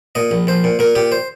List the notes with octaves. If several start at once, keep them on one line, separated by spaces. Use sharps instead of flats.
A#2 D#5
A#1
A#1 C5
A#2
A#2 A#4
A#2 G4
C5